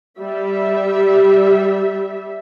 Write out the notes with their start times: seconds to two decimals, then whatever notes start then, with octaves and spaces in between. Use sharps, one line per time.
0.18 G3 E5